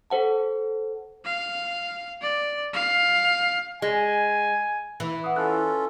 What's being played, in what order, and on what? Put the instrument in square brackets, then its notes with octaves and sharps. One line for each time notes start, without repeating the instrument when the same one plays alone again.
[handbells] A4 C5 F#5 A5
[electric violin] F5
D5
F5
[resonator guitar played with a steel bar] G#3 [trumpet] G#5
[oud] E3
[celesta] F#5 D#6
[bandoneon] C#4 F4 A4 [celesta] F#6